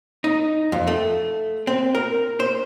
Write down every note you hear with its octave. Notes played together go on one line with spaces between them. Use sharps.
D#4
F2
A3
C4
A#4
C5